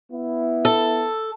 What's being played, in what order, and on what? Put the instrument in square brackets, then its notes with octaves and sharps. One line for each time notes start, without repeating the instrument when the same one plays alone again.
[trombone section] B3 E4
[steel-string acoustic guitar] A4